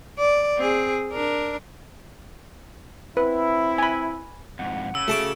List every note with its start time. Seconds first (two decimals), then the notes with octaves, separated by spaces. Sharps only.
0.19 D5
0.57 C4 G#4
1.12 D4 A#4
3.17 C4 E4 B4
3.78 G#5 B5
4.59 F2 G#2 F#5
4.95 C#3 E6
5.08 A3 F#4 G#4 E5 A5 D6